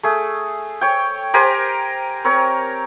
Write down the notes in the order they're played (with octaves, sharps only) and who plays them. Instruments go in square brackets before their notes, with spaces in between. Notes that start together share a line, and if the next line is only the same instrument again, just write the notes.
[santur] A3 G#4
C#5 G5
G4 A#4 C5 G#5
C4 A#4 C#5